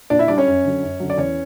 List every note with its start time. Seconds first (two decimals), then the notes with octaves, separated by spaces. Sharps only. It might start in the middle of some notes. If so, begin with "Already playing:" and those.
0.10 A#2 D4 D5
0.19 E4 E5
0.28 G3 D4 D5
0.38 C#4 C#5
0.47 F#2
0.64 D3 F#3
0.83 F#2
1.00 D3 F#3
1.10 D5
1.17 E2 C#4 C#5